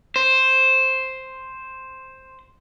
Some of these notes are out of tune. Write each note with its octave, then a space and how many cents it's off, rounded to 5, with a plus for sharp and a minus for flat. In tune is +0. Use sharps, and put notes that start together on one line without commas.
C5 +5